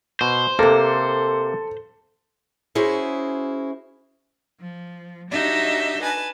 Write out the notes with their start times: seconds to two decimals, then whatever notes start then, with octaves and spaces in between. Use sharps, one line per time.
0.21 B2 C5
0.59 C3 A#3 A4
2.75 C#4 E4 F#4 G#4 C5
4.59 F3
5.30 D4 D#4 F#4 G4 D#5 E5
6.02 B4 G#5 A5